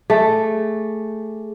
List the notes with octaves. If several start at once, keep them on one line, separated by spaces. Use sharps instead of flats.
A3 G#4